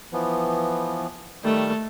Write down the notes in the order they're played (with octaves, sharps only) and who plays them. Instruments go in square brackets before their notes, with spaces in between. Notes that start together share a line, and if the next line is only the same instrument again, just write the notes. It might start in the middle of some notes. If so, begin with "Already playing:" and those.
[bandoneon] E3 F3 B3
[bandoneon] D#3 G3 [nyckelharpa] A3